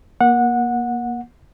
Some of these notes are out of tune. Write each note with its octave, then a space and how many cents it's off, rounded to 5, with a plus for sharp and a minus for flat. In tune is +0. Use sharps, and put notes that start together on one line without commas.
A#3 +20 F#5 -20